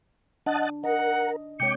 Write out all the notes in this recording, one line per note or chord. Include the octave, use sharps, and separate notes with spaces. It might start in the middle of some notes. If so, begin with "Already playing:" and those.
D4 D#5 F#5 A5
A#4 D#5 F#5
C3 G#3 C#5 G5 D6 C#7